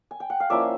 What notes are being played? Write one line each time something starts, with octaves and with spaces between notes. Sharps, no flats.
G#5
G5
F#5
F5
F3 A#3 C#4 E4 D5 E5